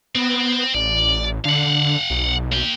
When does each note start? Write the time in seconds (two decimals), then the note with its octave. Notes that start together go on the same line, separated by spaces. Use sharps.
0.15 B3 C4
0.75 A1 D5
1.45 D3 F5 F#5
2.10 B1
2.52 A#3 G5